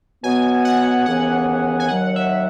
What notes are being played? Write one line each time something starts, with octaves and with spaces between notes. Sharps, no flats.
B2 F#3 B3 G#5
F#5
D#2 C#3 E3 B3 F#5
G#5
D#2 D#3 F#3 F#5
E5